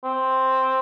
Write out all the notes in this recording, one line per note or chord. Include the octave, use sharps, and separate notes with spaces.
C4